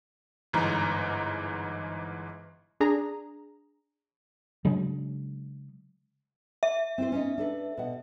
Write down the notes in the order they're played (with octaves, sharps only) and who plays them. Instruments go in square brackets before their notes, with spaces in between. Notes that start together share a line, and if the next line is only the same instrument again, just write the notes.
[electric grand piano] G1 G#2 E3 A#5
[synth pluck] D4 G#4 A#5
[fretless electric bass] C#3 F#3 G#3 D4
[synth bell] E5
[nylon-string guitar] C4 E4 C5
C#4 D#4
D4 A4 B4
B2 F#5